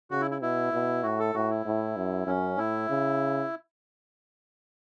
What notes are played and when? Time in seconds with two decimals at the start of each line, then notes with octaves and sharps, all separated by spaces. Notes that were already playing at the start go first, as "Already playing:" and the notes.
0.11 C#3 F#4
0.21 E4
0.31 E4
0.41 B2 E4
0.73 B2
1.03 A2 F#4
1.19 A4
1.34 A2 F#4
1.50 E4
1.65 A2
1.97 F#2
2.26 F#2 C#4
2.58 A2 E4
2.89 C#3